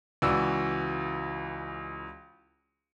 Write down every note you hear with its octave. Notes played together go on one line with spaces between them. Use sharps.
C#2 E3 F#4 D5 E6